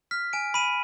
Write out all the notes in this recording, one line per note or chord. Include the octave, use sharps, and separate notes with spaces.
F6 B6
G#5 D7
B5 D#7